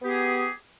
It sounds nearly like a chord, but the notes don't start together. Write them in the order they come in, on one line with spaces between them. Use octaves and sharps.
B3 G4 G#4